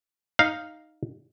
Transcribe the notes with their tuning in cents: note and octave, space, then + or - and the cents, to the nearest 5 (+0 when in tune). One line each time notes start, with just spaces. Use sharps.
D#4 +0 F5 +0